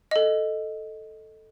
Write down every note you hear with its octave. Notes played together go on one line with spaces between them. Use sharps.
A4 D#5